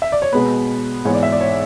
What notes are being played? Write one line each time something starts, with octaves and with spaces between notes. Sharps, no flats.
E5
D5
C#5
B2 G#3 B3 B4
G#2 E3 B3 C#5
D5
E5
D5
C#5